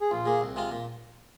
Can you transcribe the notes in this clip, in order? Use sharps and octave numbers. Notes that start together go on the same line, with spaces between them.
G#4
A#1 F4
A#2 A#3 G#4
C2
C3 G#3 F4
A#2